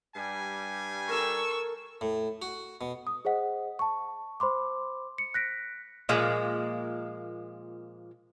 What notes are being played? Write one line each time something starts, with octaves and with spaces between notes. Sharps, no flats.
G2 G3 G#5
A4 A#4 C#6 E6
A2
F#4
B2
D#6
G#4 C5 D#5 F#5
A5 C#6
C5 B5 C6 D6
C#7
F#6 A#6 B6 D7
A#2 F3 G#3 A#3